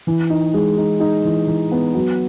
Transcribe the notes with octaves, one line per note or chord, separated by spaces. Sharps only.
E3
D#4
G#3
D#4
D#4
E3
E3
B3
F#3